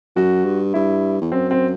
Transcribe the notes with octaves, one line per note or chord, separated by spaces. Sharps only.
F#2 F#4
G2
G2 E4
E2
F#2 C4
C4